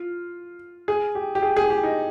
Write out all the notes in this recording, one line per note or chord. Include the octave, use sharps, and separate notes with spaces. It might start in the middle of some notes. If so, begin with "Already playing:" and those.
Already playing: F4
G#4
G4
G4
G#4
G#4
G4
D#4